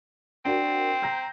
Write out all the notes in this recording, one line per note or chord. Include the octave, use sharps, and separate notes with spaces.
C4 D4 F#4 A#4
A#5 G6 A#6